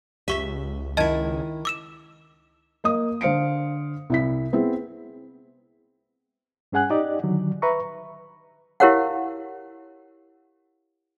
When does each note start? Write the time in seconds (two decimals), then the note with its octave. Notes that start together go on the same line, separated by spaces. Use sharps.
0.28 C#2 G4 E5 C#6 B6
0.97 D#3 E4 D#5 A5 G#6
1.65 D6 E6 E7
2.84 A#3 D#5 D#6
3.21 D3 C5 F5 C#7 D7
4.10 C2 E4 B6
4.53 B3 C4 E4 G#4
6.72 G2 C#4 G#4 F#5 G#5 F#6
6.90 D#4 G4 D5 D#5
7.24 D3 D#3 F#3
7.62 B4 E5 A#5 C#6
8.80 E4 G4 A#4 C#5 F5 F#5